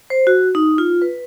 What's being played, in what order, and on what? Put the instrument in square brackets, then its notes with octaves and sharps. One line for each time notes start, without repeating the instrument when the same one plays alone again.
[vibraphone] C5
F#4
D#4
F4
B4